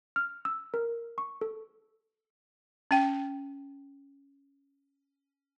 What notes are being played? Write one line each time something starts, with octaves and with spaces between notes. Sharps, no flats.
F6
E6
A#4
C#6
A4
C#4 G5